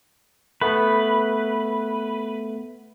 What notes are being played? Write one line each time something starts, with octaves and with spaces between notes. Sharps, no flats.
A3 B3 B4